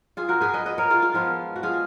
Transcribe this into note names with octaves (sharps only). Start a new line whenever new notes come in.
F4 G#4
F#4 A#4
G#4 B4
B4 D#5
B4 D#5
A#4 C#5
F4 G#4
F4 G#4
F3 G#3 B3 F4
F#4
F4 G#4